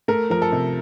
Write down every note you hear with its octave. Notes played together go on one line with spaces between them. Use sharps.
A3 A#4
F3 A#4
A4
C3